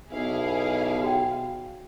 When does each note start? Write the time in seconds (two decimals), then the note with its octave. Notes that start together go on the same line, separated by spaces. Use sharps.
0.11 B1 B2 E4 G#4 F5
1.03 F#4 G5